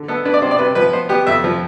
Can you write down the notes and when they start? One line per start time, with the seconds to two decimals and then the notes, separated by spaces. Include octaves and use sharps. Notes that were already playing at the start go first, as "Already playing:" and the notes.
Already playing: D3
0.08 B3 A4
0.25 D4 B4
0.34 D5
0.42 C3 C5
0.51 D5
0.59 C3 B4
0.75 F3 B4
0.93 B3 C5
1.09 B3 G4
1.27 F2 E5
1.44 F3